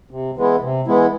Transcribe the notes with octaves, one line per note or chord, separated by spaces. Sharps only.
C3
E3 G#3 B3 E4
C3
E3 G#3 B3 E4